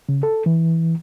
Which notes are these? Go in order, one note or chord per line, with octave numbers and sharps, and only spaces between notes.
C#3
A4
E3